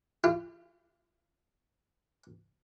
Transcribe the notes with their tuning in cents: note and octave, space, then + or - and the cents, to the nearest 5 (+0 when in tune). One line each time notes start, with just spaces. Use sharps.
F4 -30